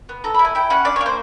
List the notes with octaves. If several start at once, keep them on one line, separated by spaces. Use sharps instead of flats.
B3
A4 A#5
B5
E4
G#5
E4 G5
C#4 F#5
D4 D5
C#5
A#3
C5